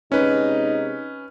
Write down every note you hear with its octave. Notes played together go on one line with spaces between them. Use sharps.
C3 G#3 C#4 D#4 B4